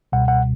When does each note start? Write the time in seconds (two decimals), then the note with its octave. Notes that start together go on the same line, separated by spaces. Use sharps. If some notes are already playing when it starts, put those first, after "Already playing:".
0.12 C#2 B2 G3 F#5
0.28 F#5